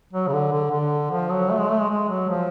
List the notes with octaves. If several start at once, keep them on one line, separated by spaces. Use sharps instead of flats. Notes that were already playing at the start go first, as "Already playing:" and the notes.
F#3
C#3
D3
D3
D3
F3
F#3
A3
G#3
A3
G#3
G#3
F#3
F3